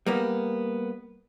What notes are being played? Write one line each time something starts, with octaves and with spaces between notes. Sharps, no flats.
G3 A#3 B3